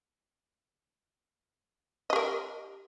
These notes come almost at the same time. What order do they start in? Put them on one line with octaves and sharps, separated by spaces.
D#5 G4 A#4